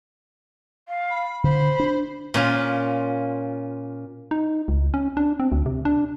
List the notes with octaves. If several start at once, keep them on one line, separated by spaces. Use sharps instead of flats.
F5
B5
D3 C5 B5
D4
A#2 C#4 F4
D#4
C#2
C#4
D4
C4
D2
C3
D4